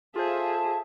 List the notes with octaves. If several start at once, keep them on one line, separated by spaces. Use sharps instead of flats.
F4 G#4 A4 C5 E5 F5 A5